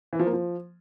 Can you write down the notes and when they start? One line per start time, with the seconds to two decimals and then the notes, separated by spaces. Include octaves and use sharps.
0.13 E3
0.19 F3
0.26 A#3
0.33 F3